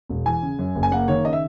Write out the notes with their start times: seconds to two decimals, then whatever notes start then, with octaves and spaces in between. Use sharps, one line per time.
0.09 E1
0.26 E3 G#5
0.42 C#3
0.59 F#2
0.75 F#1
0.83 G#5
0.92 A#3 F#5
1.08 D#3 C#5
1.25 C#3 D#5
1.33 E5